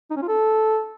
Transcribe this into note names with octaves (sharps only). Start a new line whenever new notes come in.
D#4
C#4
F4
A4